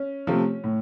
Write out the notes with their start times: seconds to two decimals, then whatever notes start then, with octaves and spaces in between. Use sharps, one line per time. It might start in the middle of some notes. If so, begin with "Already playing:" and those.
Already playing: C#4
0.27 C3 F3 A3
0.64 A2